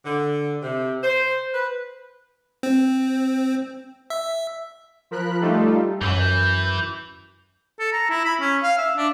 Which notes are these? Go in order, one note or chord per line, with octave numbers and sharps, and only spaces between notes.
D3
C3
C5
B4
C4
E5
F3 A#4 B5 F#6
G3 A3 D#4 F4 G4 A4
F#2 E3 G6
A4
A#5
E4
B5
C#4
F5
E5
D4